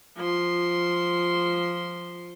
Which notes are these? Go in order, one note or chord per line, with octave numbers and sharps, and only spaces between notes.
F3 C6